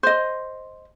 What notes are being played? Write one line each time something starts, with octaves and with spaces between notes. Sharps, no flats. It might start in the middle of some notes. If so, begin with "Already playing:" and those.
C5 D#5